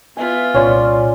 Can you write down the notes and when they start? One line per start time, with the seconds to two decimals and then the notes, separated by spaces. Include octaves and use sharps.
0.17 B3 F4 E5 G#5
0.54 C2 A#2 C#4 C#5 D5 C6